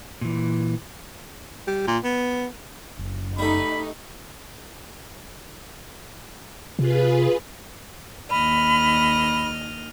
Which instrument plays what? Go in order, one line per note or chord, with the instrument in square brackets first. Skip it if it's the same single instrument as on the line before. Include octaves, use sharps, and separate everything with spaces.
[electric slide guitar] A#2 E3
[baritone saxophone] G3
A#2
B3
[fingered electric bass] F#1
[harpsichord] G3 A3 [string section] D#4 [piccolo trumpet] B5
[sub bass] C3 [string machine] F4 G#4 B4
[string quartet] D#2 D#5 F6 [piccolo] B5